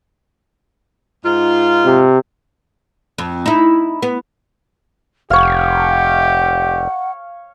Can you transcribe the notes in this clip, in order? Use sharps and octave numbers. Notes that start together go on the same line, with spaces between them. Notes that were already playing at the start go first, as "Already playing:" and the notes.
G#2 D#4 F4
C3
F2
D#4 E4
B3
F1 G4 C#5 F5 F#5